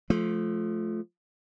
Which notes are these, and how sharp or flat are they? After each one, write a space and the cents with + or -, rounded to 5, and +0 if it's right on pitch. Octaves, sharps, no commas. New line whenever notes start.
F3 +0 A3 -25